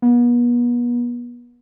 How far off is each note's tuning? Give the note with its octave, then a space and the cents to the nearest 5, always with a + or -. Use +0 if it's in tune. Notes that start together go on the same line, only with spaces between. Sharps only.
B3 -40